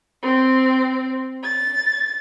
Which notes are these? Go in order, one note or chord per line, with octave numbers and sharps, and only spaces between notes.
C4
A6